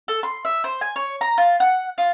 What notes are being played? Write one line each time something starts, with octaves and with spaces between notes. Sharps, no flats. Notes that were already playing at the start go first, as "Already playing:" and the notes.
A4
C6
E5
C5
G#5
C#5
A#5
F4
F#5
F4